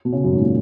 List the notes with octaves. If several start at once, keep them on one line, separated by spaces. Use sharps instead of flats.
B2
C#3
F#2
G#2
A#2